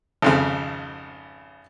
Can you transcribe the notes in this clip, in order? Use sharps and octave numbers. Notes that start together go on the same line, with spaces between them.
G#1 F2 C#3